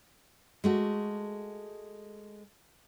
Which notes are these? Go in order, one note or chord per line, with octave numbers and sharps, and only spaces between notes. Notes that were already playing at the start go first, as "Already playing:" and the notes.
G#3 A3 F#4